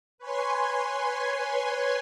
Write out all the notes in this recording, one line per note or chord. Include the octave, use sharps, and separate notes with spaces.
B4 C#5 G#5 C6